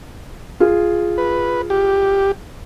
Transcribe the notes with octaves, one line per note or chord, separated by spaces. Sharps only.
F4 G#4
B4
G4